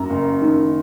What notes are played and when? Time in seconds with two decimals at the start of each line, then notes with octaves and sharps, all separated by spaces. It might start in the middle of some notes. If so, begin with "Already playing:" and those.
Already playing: F#2 A#5
0.10 F#1
0.42 D#3